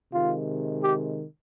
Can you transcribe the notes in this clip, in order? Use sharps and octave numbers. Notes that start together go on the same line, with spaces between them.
C3 D#3 G#3 F4
G4